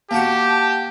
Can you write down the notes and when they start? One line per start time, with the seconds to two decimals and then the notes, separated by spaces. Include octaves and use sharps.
0.11 A#3 F#4 G4 A5